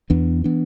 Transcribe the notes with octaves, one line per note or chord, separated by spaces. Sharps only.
E2 E3 B3 D4
E3 B3 D4